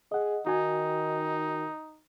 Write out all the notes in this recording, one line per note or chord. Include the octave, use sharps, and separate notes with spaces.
G#4 D#5 F#5
D#3 D#4 F#4 G#5